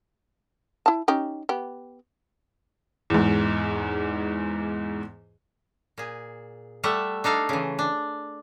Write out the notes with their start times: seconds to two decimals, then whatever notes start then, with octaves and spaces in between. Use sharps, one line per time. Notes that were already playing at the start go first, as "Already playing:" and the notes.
0.86 E4 A5
1.08 C#4 D#4 G4
1.49 B3 G4
3.10 E2 G#2
5.98 A#2 G#4
6.84 G3 A3 E5 F#5
7.24 D4 D#4 A4 F5
7.49 C#3 E3
7.79 D4